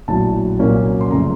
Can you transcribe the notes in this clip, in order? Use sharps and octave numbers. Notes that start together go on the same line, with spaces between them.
A#1 A2 F#3 A5
C2 A#2 F#3 A#3 C#4
C6
F#2 C#3 F3 A3 A#5